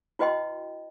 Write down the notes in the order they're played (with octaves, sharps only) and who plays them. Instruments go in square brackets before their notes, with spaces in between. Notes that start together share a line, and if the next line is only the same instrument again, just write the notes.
[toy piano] E4 F#4 B4 D#5 G5 C6